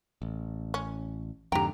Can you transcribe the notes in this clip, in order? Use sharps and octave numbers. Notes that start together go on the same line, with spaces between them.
A1
C#4
F2 G#2 D3 G4 G5 A#5